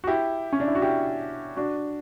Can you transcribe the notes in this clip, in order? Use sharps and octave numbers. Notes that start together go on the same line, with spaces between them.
F#4
E4 G4
C#4
D4
E4
F#4
E4 G4
D4 F#4